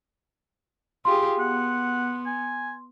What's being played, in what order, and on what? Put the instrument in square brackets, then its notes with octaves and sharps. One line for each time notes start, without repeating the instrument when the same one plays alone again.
[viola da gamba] F4 G4 G#4 [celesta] C6
[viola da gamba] B3 [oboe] F#5
[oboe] G#5